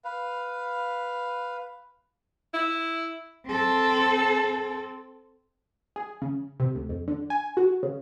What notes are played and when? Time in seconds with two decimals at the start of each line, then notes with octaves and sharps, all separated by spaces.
0.04 B4 F5
2.54 E4
3.46 C4 A4
5.96 G#4
6.22 C#3
6.60 C3
6.75 D2
6.89 F2
7.08 D3
7.30 G#5
7.57 F#4
7.83 C#3